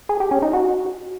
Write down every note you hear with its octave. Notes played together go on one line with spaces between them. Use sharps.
G#4
G4
C#4
D#4
F#4